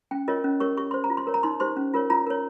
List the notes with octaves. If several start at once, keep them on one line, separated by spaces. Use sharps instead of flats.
C#4 G5
F4 A#4 C#5 D#5
C#4
G4 A#4 C#5 C#6
G4 C#6
C5 C6
A#5
F4
C6
A#4 C#5
A#5
D#4 C6
G4 C5 C6
C#4
F4 A#4 C#5
F4 A#5
A#4 C#5